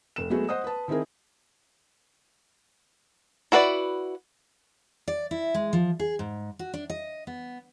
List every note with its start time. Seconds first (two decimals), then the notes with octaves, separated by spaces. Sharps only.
0.16 F1 E7
0.30 F#3 G#3 A3 B3 F#4 G#4
0.49 C5 D#5 F#5 D#6
0.64 B4 A5
0.88 D#3 C4 E4 G#4 A#4
3.52 E4 F#4 B4 C5 D5
5.08 D5
5.31 E4
5.54 G#3
5.73 F3
6.00 G#4
6.19 G#2
6.59 F#4
6.74 D4
6.90 D#5
7.27 B3